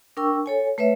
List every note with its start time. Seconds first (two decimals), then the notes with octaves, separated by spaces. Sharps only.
0.17 D4 A#4 G5 C#6 E6
0.46 A4 C#5 G#5
0.78 A3 B4 C#5 E5